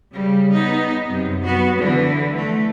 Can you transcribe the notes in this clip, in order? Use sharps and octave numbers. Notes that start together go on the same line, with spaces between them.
C#3 G3
B3 D#4
F#2 C3
B3 F#4
D3 E3
A3